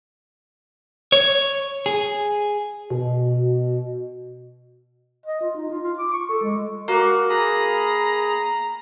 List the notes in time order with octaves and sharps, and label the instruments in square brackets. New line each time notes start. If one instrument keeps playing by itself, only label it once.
[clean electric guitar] C#5
G#4
[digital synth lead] B2
[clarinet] D#5
F4
D#4
F4
F4
D6
C#6
A4
G#3
[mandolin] A#3 [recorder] F#4
[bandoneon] G#4 B5 D#6 [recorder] A#5